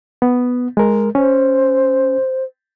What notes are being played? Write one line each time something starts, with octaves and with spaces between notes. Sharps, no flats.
B3
G#3 A#4
C#4 C5